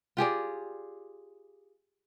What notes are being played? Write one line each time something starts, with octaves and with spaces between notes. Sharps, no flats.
F4 G4 G#4 D5